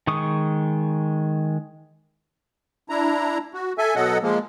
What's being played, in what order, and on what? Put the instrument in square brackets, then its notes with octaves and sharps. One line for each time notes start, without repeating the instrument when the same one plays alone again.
[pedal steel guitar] D#3 G#3 C#6 D#6
[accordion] D4 E4 A#5
F#4
A4 E5 G#5
B2 F#3 A4 D#5 F#5
F3 G#3 A#3